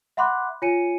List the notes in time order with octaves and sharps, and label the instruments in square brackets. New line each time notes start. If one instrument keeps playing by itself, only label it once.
[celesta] E5 F#5 B5 C6 D6 F#6
F4 C#5 G#5 C#7 D#7